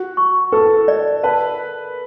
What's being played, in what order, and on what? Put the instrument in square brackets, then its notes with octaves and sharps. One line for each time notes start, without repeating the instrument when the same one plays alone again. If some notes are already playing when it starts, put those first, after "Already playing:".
Already playing: [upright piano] F#4
[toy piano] C#6
[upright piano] A4 [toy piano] B4
[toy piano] D5
[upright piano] B4 [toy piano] A5